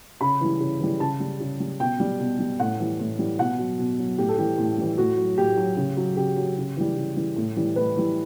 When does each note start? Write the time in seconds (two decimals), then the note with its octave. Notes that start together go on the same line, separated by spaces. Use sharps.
0.21 C#3 B5
0.41 E3 G3
0.60 C#3
0.80 E3 G3
1.00 C#3 A5
1.20 G3
1.40 C#3
1.60 G3
1.80 B2 G5
2.00 G3
2.20 B2
2.39 G3
2.60 A2 F#5
2.79 E3 G3
2.99 A2
3.19 E3 G3
3.39 B2 F#5
3.59 F#3
3.78 B2
3.99 F#3
4.18 A2 G4
4.29 A4
4.38 E3 G3 G4
4.58 A2
4.78 E3 G3
4.98 A2 F#4
5.17 F#3
5.37 A2 G4
5.57 F#3
5.77 C#3
5.97 F#3
6.16 C#3 G4
6.37 F#3
6.57 C#3
6.76 E3 G3
6.96 C#3
7.16 E3 G3
7.36 A2
7.56 E3 G3
7.76 A2 B4
7.96 E3 G3